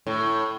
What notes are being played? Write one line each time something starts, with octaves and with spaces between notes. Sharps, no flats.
A2